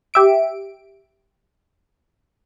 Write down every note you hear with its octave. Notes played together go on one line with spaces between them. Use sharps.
G4 E5 D7